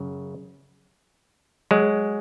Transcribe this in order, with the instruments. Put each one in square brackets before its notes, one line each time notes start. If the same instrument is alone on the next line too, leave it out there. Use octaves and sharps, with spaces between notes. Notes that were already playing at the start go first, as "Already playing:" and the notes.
Already playing: [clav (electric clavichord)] F#2 C#3
F#3 G#3